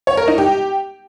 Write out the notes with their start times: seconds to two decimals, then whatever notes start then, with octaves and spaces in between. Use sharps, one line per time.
0.07 C#5
0.17 A#4
0.28 D#4
0.38 G4